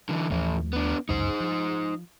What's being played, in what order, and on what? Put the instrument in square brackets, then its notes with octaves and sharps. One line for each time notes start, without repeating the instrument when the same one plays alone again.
[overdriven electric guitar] D3 E3
[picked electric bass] D#2 F3 A3 [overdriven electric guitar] A2 E3
[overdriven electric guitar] B3 D4
[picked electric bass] G1 C#2 F#2 [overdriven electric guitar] D#4 C5
[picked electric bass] F3